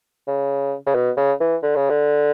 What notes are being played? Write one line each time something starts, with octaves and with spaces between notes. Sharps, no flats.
C#3
C#3
B2
C#3
E3
D3
C#3
D3